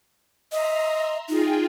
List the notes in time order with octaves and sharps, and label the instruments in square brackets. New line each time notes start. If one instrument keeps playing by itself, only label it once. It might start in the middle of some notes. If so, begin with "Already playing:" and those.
[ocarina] D#5 [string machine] E5 A#5 C6
[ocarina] D#4 [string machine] F4 G#4 G5